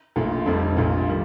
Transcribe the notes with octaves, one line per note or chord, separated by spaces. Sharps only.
A#1 A#2 A3
F1 F2 D3 G3
A#1 A#2 A3
D#3 G3